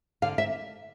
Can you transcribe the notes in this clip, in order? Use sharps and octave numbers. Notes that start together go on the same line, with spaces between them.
D3 F5
E5